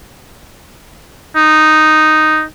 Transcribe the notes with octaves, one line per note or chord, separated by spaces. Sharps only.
D#4